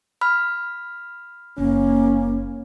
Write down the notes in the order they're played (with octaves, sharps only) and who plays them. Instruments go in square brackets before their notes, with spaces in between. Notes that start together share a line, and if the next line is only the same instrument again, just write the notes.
[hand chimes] B5 F6
[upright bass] F#1 [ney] A#3 [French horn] C#4